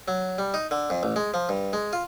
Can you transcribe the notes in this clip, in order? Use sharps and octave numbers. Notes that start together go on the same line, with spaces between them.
F#3
G3
D#4
D3
F2
A1
G#3
F3
G2
G#3
F4